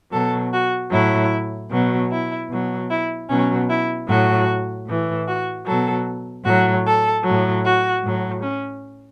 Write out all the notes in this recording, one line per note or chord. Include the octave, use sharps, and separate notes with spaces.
B2 F#3 A4
F#4
A2 F#3 E4
B2 F#3
E4
B2 F#3
E4
B2 F#3 C#4
E4
A2 F#3 F#4
A2 E3
F#4
B2 F#3 A4
A2 F#3 F#4
A4
A2 F#3
F#4
A2 F#3
C#4